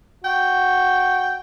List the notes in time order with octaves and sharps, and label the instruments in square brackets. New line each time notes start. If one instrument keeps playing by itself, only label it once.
[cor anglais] F#4 [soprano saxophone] G5